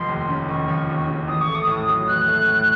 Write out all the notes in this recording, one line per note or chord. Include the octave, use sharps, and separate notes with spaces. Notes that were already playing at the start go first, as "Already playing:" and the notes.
Already playing: F1 F3 C6
D#2
C#3
F1 C#6
F3
D#2
C#3
A1 D#6
C#6
A3
D#6
A2
F#3
A1 F#6
A3
A2